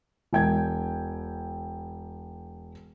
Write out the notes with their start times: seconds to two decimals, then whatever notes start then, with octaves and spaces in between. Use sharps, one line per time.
0.33 E1 G5 G#6